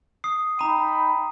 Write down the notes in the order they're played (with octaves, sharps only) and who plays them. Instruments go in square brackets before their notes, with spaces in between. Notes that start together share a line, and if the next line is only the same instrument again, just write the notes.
[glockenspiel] D#6 C7
[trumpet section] D#4 G5 B5 [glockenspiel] A#5 D#7